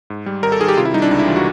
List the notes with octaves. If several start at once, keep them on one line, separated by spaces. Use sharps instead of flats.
G#2
G3
G#1 A#4
A4
D#3 G#4
G4
C3 F4
E4
G3 D#4
D4
C#2 D#4
E4
E3 F4
F#4